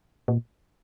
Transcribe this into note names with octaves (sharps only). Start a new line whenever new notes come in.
A#2